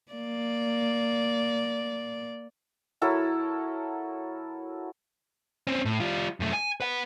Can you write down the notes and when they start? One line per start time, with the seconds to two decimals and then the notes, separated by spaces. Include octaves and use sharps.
0.12 A#3 D5
3.02 F#3 E4 A4 A#4
5.67 C4 C#4
5.85 A2
6.00 G3 F4
6.40 F#2 A3
6.53 G#5
6.80 B4 F#5